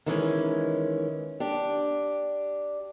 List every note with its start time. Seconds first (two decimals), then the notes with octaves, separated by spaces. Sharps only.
0.06 D#3 E3 G#3 C#4
1.40 D4 G4